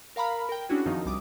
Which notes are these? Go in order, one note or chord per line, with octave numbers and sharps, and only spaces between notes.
A#4 F5 A#5 B5 F6
A#4 G5
C#4 D4 E4 F#4 G#4
F#2 D#3 F3 C4 D#4
C2 G3 D6 D#6